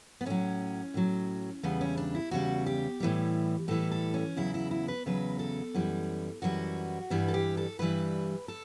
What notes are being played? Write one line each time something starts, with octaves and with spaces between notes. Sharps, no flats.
B3
A2 F#3 C#4
A2 F#3
E2 C#3 G3 B3
C#4
D4
E4
E2 C#3 G3 F#4
G4
A2 E3 G3
A2 E3 G3 A4
A4
C#4
E2 C#3 F#3 E4
E4
E4
B4
E2 C#3 F#3 B4
A4
F#2 E3 G3
F#2 E3 G3 F#4
G2 E3 G3 B3
A4
G4
A4
G2 E3 G3 B4
A4